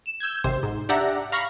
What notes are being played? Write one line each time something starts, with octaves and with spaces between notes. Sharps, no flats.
E7
E6 G6 G#6
G#1 C3 C5
G#2
D4 G4 D5 E5 F#5 A#5
F5 A#5 B5 C#6 F6